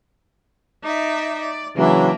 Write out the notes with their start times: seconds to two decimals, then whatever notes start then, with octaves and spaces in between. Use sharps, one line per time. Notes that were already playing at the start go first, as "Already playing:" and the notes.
0.83 D#4 D5 E5
1.40 D5
1.77 C#3 E3 F#3 A#3 D4 E5